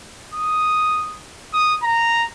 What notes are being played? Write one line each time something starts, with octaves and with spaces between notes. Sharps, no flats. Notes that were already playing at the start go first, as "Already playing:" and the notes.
D#6
D#6
A#5